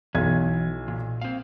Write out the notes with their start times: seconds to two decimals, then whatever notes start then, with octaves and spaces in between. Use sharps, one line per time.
0.15 B1 E3 G#6
0.88 A#2
1.21 C4 F5